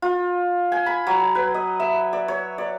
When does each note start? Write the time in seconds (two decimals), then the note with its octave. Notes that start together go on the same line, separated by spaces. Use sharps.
0.02 F4
0.72 G#5
0.86 B5
1.07 F#3
1.35 B4
1.54 D#5
1.80 E5
2.13 D5
2.28 C#5
2.58 D5